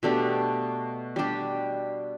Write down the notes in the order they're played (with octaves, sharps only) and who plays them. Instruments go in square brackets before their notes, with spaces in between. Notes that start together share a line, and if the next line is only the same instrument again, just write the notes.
[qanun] B2 A3 D4 G4
G3 D4 G4